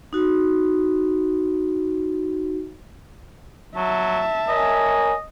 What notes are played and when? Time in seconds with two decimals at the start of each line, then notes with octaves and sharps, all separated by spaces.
0.13 D#4 F#4
3.76 F#3 E5 A5
4.49 A#4 C#5 D#5 G#5